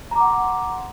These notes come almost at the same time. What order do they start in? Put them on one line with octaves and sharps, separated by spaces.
A#5 D6 F#5 C6